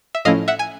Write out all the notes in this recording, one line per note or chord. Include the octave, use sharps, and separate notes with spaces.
E5
A2 F3 A3 C#4 E4 D#5 F5
E5 F#5
G#5